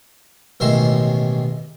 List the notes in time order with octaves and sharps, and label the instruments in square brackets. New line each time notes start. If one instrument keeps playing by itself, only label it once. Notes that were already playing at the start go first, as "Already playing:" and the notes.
[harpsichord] A1 B2 D#3 G#3 E5 C6